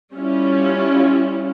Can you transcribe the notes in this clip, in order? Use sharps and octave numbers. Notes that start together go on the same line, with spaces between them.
G3 C#4 E4 F4